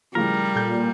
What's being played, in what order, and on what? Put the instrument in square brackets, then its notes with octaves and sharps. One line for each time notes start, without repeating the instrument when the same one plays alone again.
[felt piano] A2 C#3 F3 [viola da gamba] G3 [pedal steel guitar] A#4
[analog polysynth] A#2 [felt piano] A4 G6